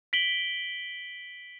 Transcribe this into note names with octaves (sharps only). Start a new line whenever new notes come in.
B6 D7 F#7 G7